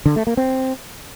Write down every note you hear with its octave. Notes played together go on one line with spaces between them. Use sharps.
D3
A3
A#3
C4